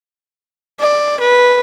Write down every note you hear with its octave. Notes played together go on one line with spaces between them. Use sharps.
D5
B4